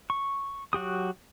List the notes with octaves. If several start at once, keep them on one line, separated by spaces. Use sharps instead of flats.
C#6
F#3 F#4 G4 D#6